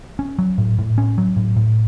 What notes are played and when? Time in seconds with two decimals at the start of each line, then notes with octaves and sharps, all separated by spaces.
0.19 C#4
0.39 F#3
0.58 A2
0.79 A2
0.98 C#4
1.18 F#3
1.36 A2
1.56 A2